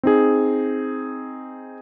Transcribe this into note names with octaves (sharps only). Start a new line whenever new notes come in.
C4 D#4 G#4